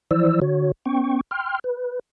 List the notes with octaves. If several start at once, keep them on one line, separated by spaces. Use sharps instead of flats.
E3 F3 E4 C5 D5 E6
D3 F#4 C#5
B3 C#4 G5 C#6
G5 C6 F6
B4